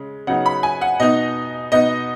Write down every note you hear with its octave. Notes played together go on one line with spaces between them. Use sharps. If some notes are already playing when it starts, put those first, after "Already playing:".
Already playing: C#3 G#3
C#3 F#3 B3 D#4 F#5
B5
G#5
F#5
B2 B3 D#4 D#5
B2 B3 D#4 D#5